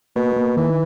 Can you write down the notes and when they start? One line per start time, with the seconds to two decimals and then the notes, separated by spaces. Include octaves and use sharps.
0.16 B2 A#3
0.36 A#3
0.57 D#3 E3